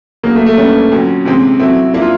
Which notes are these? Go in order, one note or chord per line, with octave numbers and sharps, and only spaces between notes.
C#3 F#3 A#3 B3 D#4
A3
A3
G3 B3 C#4 D4
F2 D3 F#3
C3 E3 G#3 C4
F#3 A3 C4 E4
F3 A#3 D4 E4
F4